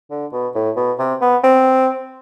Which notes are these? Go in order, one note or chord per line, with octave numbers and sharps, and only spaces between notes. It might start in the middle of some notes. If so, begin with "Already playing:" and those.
D3
B2
A2
B2
C3
B3
C4